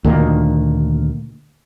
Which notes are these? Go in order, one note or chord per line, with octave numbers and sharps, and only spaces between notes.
D2 A#2 D#3 A#3